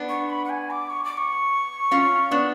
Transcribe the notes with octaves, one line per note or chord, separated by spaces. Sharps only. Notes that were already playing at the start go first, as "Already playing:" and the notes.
Already playing: B3 D4
C#6
B5
F#5
G#5
D6
C#6
D6
C#6
C#4 F4
B3 D4